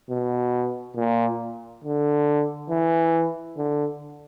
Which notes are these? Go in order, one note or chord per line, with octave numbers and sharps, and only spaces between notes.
B2
A#2
D3
E3
D3